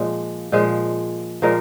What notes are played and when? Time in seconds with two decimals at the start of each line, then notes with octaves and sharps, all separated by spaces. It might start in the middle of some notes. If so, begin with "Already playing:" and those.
Already playing: A#2 F3 G#3
0.52 A#2 F3 G#3
1.42 A#2 F3 G#3 A#4